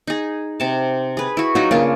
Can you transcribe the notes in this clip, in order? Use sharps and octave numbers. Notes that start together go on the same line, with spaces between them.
D#4 G#4
C3 A5
G#4 B4
E4 F#4
F#3 D#4 F4 F#4
C#3 A#3 D4 F4